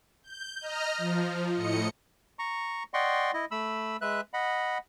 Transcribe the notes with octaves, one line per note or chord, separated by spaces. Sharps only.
G6
D#5 A#5 F6
F3
A2 D#5 C#7
A#5 C#6
D5 D#5 F#5 G5 C6 C#6
E4 D#5
A3 B5 E6
G#3 B4 E5 F#6
D#5 F#5 B5